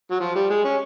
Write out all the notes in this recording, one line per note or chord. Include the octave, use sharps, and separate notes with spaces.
F#3
F3
G3
G#3
C#4